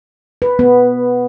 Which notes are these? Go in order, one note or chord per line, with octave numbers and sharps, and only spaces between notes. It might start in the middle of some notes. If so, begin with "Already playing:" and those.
B4
B3